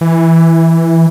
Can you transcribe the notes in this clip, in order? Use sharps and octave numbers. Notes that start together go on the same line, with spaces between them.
E3